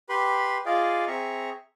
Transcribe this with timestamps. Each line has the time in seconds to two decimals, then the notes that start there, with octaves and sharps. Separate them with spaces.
0.09 G4 B4 B5 C6
0.66 F4 G#4 D5 D#5 F5
1.07 C4 G#4 E5 A#5 C#6